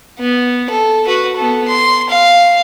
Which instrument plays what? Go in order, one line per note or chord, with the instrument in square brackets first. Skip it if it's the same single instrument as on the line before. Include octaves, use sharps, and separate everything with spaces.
[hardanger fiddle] B3
A4
F#4 B4
B3 A4
C6
F5